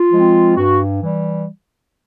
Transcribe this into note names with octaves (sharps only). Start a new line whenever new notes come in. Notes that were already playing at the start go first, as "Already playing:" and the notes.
Already playing: F4
F3 G#3 C4
G2 F#4
E3 G3